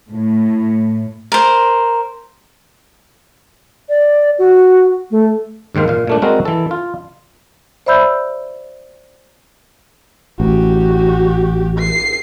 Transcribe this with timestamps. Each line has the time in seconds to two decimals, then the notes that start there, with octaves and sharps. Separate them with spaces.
0.11 A2
1.32 A#4 C5
3.89 D5
4.39 F#4
5.11 A3
5.75 D#2 G#2 D#3 C5 F5
5.88 A#2 F5
6.07 A#2 A3 D4
6.22 G3 G#3 C4 F#4 A#4
6.45 E3 A4
6.71 F4
7.86 C5 D5 E5 B5 E6 G6
10.40 A1 F#4 G4
11.79 C7